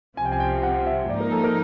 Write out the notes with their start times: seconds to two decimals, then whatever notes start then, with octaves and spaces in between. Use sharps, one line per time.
0.17 C2 C3 F3 G#5
0.25 G5
0.32 G#5
0.40 G5
0.63 F#5
0.86 E5
1.09 G#2 F3 A#3 D#4 D5
1.20 A#4
1.32 A4
1.44 A#4